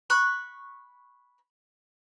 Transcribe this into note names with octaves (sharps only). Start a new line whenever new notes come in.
B5 C#6 F#6